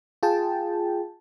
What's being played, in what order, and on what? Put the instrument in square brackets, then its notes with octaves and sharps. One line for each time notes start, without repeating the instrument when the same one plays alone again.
[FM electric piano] F4 G#4 G5 A5